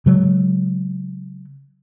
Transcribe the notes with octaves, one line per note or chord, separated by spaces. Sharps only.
C#3 F#3 G#3